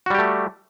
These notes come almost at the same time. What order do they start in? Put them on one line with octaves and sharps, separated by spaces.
F#4 G3 G4 A3